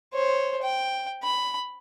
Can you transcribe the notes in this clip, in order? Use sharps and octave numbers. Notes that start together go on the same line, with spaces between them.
C5 C#5
G5
B5